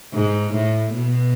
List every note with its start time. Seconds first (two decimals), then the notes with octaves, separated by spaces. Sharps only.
0.14 G#2
0.54 A2
0.95 B2